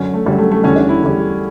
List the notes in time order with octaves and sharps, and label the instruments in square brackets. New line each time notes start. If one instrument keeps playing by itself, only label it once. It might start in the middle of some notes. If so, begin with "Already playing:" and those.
Already playing: [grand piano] F#2 D3 F#3 C#4
A3
F#2 D3 F#3 G3
A3
A3
E2 D3 G3 C#4
D4
E4
E2 D3 G3